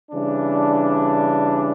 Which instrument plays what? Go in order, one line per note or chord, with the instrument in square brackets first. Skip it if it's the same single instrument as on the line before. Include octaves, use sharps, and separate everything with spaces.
[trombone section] C#3 E3 G3 D4